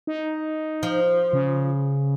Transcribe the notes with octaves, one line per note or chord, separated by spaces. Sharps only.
D#4
F3
C#3